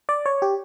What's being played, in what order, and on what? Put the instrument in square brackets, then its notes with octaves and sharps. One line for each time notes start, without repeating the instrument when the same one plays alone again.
[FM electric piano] D5
C#5
G4